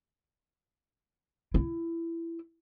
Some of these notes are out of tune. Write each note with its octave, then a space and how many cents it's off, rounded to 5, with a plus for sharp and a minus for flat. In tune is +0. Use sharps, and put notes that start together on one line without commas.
E4 +20